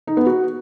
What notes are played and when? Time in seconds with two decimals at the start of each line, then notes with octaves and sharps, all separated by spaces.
0.07 D#4
0.17 B3
0.26 F#4